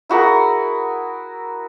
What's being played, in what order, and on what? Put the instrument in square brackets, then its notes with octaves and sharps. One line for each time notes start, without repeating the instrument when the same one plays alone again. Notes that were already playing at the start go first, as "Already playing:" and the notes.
[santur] E4 F#4 G#4 A#4